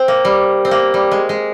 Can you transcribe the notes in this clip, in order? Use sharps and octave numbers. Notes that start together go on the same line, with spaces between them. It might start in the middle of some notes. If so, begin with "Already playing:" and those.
Already playing: C4
A#3
G3
C4
A#3
G3
G#3
G#3